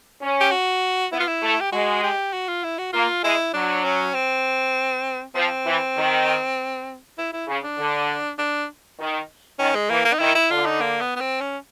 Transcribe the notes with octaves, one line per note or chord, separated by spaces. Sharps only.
C#4
G4
F#4
B3 E4
F4
E4
A3
G4
G#3 F#4
G4
F#4
F4
E4
F#4
A#3 F4
G#3 E4
F#3 D4
C#4
C4
F3 C4
E3
D#3
E4
E4
C#3
D4
D3
D4
D#3
D#3 C#4
G#3
E3 A#3
A#3
D#4
D#3 E4
E4
D3 F4
D#4
A#3
B3
B3
C4
C#4